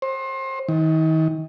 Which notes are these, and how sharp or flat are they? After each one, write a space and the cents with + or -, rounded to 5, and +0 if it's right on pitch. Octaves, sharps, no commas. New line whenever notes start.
C5 +30
D#3 +40